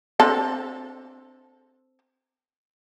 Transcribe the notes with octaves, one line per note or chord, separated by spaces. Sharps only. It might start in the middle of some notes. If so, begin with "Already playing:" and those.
C4 D4 A4